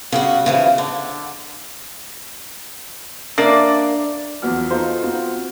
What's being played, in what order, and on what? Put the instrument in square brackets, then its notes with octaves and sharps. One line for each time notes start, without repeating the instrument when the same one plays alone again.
[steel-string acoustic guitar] C#3 G3 F#4
C#3 E3 F3
D3
[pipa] A#3 [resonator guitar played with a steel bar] D4 D5 E5
[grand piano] E2 F3 F#3 B3 F#4 F6
B3 D#4 F4 A4 C5
B3 C4 F4 F#4